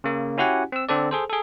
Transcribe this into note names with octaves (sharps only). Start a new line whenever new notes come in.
C#3 A#3
C#4 E4 F#4 G4 F#5 G#5
C4 E6
D3 C4 A4 D5
G#4 A4 C5
G#4 A4